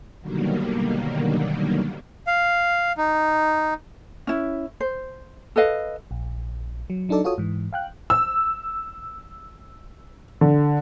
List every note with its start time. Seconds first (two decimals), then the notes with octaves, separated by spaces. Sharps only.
0.22 B2 D3 D#3 F#3 G3 A#3
2.27 F5
2.98 D#4
4.27 C#4 E4
4.80 C5
5.56 A4 B4 D#5 F5
6.11 A#1
6.90 F#3
7.09 F#3 D4 D#4 A4 D5
7.24 F4 F#4 A4 C#5 D#6
7.38 G#2 E3
7.73 F5 G5 F#6
8.10 E6
10.41 D3